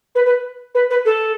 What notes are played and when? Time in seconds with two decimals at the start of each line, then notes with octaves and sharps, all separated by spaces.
0.15 B4
0.25 B4
0.74 B4
0.90 B4
1.05 A4